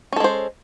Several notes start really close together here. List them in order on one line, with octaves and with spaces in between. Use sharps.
C#4 A4 G#3 C5